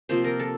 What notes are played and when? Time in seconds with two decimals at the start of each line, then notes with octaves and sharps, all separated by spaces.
0.09 C3 F3 A#3 C5
0.24 A#4
0.39 A4